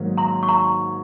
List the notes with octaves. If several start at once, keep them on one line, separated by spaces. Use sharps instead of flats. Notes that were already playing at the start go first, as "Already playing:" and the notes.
Already playing: G#2 D#3 F#3 A#3
A#5 C6
C#6
A#5 C6